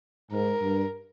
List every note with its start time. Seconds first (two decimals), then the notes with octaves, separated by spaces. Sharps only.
0.32 G#2 A#4
0.61 G2